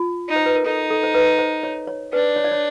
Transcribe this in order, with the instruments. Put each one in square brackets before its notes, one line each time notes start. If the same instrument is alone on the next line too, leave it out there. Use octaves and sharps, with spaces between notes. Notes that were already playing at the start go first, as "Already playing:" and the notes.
Already playing: [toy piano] F4
[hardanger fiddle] D#4
[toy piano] C5
B4
A#4
[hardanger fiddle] D#4 [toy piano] A4
[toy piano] A4
C5
B4
C5
C#5
C#5
[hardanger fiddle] D4 [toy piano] B4
[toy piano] C#5
D5
C#5